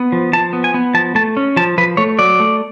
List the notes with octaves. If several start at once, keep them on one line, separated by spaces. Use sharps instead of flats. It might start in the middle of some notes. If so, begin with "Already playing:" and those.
Already playing: B3
F3
F3 A5
B3
G#5
B3
F3 A5
A3 A5
C#4
F3 A5
F3 B4
A3 C#5
F#3 D5
A3